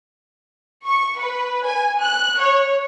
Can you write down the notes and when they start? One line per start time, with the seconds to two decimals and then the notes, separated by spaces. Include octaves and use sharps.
0.85 C#6
1.19 B4
1.65 G#5
2.01 F#6
2.38 C#5